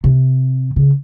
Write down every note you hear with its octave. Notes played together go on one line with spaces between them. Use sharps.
C3
C#3